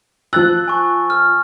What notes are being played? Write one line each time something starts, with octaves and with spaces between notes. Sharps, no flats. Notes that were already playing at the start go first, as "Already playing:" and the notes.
F3 E6 F#6 A6
G#5 C#6
F6